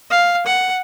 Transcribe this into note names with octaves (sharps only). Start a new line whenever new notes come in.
F5
F#5